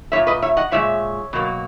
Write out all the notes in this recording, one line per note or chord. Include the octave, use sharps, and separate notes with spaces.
G#3 C#5 E5
A#2
B4 D#5
C#5 E5
D#5 F#5
A#2 G#3 C#5 E5
B2 F#3 A#3